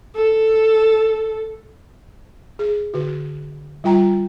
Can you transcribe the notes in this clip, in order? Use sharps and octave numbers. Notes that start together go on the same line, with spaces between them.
A4
G#4
D3 F#4
G3 F4 G5 A#5